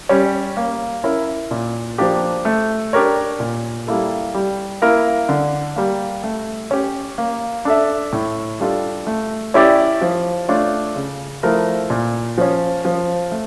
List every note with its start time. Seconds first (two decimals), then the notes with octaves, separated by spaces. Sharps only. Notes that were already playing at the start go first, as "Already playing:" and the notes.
0.09 G3 C#4
0.57 A#3
1.04 C#4 E4 A#4
1.51 A#2
1.98 F3 A#3 D4 G4
2.45 A3
2.93 D4 G4 A#4 C#5
3.40 A#2
3.87 G3 A#3 E4 A4
4.34 G3
4.82 A#3 E4 A#4
5.29 D3
5.76 G3 A#3
6.24 A3
6.71 C#4 G4
7.18 A#3
7.65 D4 A4 E5
8.13 A2
8.60 G3 D4 F4 A4
9.07 A3
9.54 C#4 E4 G4 D5
10.01 F3
10.49 A3 D4 F4 C#5
10.96 C#3
11.43 F3 A3 E4 A#4
11.90 A#2
12.38 F3 C#4
12.85 F3
13.32 A3